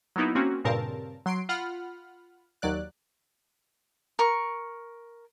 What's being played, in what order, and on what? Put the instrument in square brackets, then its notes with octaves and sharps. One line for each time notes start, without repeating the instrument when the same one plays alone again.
[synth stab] F#3 A#3 B3 D#4 E4
A#3 C4 C#4 F#4
G2 A#2 C#3 C4 A#4 A5
F#3 C6 C7 D7
F4 F#5 B5 F6
D#2 F#3 D5 F#6
[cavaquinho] A#4 C#6